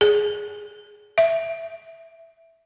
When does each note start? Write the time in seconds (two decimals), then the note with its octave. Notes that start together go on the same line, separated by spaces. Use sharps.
0.01 G#4
1.18 E5